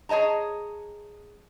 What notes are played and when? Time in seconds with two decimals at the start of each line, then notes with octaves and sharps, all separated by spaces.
0.09 G#4 C#5 D#5 A5 A#5